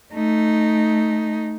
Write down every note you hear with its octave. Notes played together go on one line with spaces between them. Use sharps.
A3 D#4